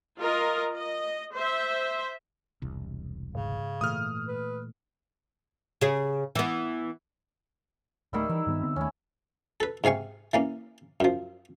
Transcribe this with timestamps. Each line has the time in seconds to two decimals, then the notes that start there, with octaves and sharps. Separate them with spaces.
0.19 F4 A#4 D#5
0.76 D#5
1.34 C5 E5
2.62 E1 C2
3.35 G#2 C#3
3.81 A#2 E3 A3 D#6 F6
4.28 B4
5.81 C#3 G#4
6.35 E3 B3
8.13 D1 D#3 G3 A3 E4
8.29 E3 E5
8.47 G2 D#3 B3
8.62 D3 B3 C4
8.76 D#2 D#3 A3 C#4 E4
9.60 A4 B4
9.84 G#2 C3 F5 G#5 C#6
10.33 E3 A#3 C#4
11.00 F#2 F3